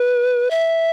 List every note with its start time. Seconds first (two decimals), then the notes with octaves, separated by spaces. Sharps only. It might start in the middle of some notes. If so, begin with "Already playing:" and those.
Already playing: B4
0.51 E5